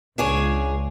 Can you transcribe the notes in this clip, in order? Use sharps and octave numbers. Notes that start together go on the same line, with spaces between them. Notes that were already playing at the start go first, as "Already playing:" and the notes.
C#2 D4 G#4 C#5